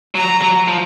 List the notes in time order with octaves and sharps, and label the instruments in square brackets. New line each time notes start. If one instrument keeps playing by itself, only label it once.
[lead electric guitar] F#3 [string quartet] A#5
[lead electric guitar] F#3
F3